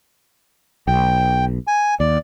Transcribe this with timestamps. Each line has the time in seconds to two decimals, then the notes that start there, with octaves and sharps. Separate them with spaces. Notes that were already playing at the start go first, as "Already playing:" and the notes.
0.87 B1 G5
1.67 G#5
2.00 D#2 D5